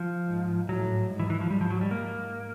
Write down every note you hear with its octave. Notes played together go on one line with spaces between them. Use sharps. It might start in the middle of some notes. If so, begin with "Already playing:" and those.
Already playing: F3
G#2
A2 F#3
G#2
E3
E3
F3
G#2 G3
F3
F#3
G3
A#3